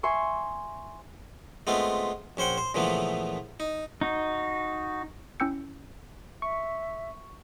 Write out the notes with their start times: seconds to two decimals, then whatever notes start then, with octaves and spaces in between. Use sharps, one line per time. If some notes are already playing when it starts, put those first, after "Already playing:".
0.03 E5 G#5 C6 C#6
1.67 G#3 A3 B3 C4 F4
2.37 A#1 C#4 C5 F#5 G5
2.58 C5
2.74 A#2 C#3 E3 F3 A3 B3
3.60 D#4
4.01 D#4 F#4
5.40 C#4 E4 G5 E6 G6 C#7
6.42 E5 C#6